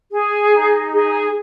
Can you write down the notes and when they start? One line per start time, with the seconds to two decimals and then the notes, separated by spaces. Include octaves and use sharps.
0.12 G#4
0.52 D#4
0.93 G#4